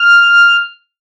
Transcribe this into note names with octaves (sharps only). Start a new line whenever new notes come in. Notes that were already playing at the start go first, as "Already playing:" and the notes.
Already playing: F6